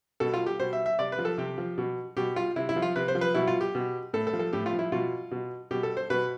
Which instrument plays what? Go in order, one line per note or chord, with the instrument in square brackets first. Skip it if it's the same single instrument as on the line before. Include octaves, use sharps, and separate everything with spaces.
[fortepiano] B2 A4
F4
G4
B2 C5
E5
E5
C3 D5
B4
F3
A4
C3 G4
F3
B2
B2 G4
F4
C3 E4
E4
F3
F4
C3 B4
C5
F3
B4
B2 E4
F4
G4
B2
A2 A4
A4
F3
A4
A2 G4
F4
F3
E4
B2 F4
B2
B2 G4
A4
C5
B2 B4